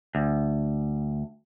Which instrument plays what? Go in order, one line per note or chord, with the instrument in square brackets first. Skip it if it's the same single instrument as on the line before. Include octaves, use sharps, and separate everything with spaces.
[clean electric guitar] D2